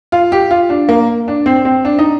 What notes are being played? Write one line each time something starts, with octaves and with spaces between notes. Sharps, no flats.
F4
G4
F4
D4
A#3
D4
C4
C4
D4
D#4